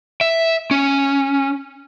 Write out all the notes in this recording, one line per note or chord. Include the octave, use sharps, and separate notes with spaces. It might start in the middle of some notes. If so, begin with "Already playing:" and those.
E5
C#4